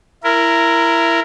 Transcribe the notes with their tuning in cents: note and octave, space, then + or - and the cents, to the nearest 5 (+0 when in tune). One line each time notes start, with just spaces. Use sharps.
E4 +20 A#4 -5